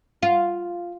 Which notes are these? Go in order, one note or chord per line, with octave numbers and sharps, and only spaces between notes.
F4